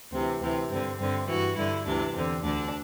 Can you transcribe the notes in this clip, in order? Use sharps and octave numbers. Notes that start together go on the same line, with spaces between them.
D2 C3 E3 C4
D2 C3 E3 C4
G2 D3 C4
G2 D3 C4
G2 E3 F#4
G2 D3 E4
D2 C3 E3 D4
E2 D3 C4
D2 D3 D4